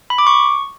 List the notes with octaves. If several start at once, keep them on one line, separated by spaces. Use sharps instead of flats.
B5
D6
C#6